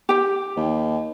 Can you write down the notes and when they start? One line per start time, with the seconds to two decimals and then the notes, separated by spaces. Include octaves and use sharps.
0.09 G4 G5
0.56 D#2